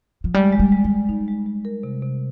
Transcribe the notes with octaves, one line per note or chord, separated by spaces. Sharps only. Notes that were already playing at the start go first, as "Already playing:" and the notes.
F3
G3 G#3
G#3
G3
G#3
G3
G#3
G3 D#4
G#3
G#3
A#4
C3
C3